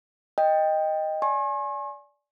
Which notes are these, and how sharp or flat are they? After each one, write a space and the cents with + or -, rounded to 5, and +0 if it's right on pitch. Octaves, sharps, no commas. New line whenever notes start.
D#5 +0 G5 +10
D5 -15 G#5 +15 C#6 -45